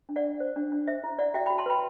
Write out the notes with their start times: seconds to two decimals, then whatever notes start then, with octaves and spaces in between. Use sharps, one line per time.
0.09 D4
0.16 D5 F#5
0.24 D4
0.40 C5
0.56 D4
0.72 D4
0.88 C5 E5
1.04 E4
1.19 E4 D5 F#5
1.34 F#4 E5 G5
1.46 F#4 G5 B5
1.58 A5 C6
1.66 B4 G5 B5